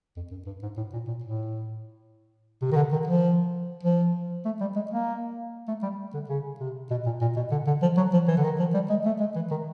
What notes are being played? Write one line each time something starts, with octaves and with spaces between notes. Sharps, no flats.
F2
F#2
G2
G#2
A2
A#2
A#2
A2
C3
D#3
D3
D#3
F3
F3
A3
G3
G#3
A#3
A3
G3
D3
C#3
C3
B2
A#2
A#2
B2
D3
D3
F3
F#3
F3
E3
D3
D#3
F3
G3
G#3
A3
G#3
E3
D#3